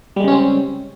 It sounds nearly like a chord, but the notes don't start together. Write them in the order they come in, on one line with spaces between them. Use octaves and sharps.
G3 G#3 C#3 C#4 C4